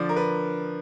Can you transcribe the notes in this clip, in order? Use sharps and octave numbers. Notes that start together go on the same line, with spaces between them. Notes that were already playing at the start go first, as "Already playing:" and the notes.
Already playing: D3 F3 D5
A#4
B4